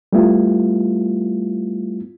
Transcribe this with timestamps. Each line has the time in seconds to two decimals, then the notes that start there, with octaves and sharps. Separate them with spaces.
0.13 G3 A3 B3 E4 F4